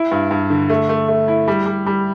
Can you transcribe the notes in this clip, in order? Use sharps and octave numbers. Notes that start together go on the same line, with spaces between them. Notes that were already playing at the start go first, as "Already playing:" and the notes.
Already playing: E4
G2
G2
D3
A3
A3
A3
E4
G3
G3
G3